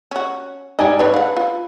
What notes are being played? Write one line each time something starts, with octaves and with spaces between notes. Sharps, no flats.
C#4 F#4
G#2 G4 D5 D#5 G#5
D4 B4 C#5
F5 F#5
F4